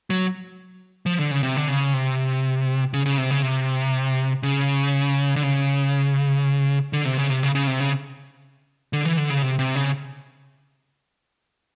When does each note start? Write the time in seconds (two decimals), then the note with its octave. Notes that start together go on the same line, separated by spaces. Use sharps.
0.10 F#3
1.06 F3
1.19 D3
1.31 C#3
1.43 C3
1.56 D3
1.68 C#3
1.93 C3
2.93 C#3
3.06 C#3
3.18 C3
3.31 C#3
3.43 C3
4.43 C#3
5.36 D3
5.43 C#3
6.93 D3
7.05 C3
7.17 C#3
7.30 C3
7.43 C#3
7.55 C#3
7.67 C3
7.80 C#3
8.93 D3
9.05 E3
9.17 D3
9.30 C#3
9.42 C3
9.59 C3
9.75 C#3